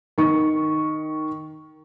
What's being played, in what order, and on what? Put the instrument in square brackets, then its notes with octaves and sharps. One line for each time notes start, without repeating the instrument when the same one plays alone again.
[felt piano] D#3 C#6